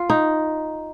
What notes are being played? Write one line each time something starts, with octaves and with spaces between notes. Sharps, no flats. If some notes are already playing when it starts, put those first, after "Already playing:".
Already playing: F4
D#4